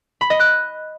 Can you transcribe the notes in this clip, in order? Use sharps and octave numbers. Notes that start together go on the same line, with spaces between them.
B5
D#5
F#6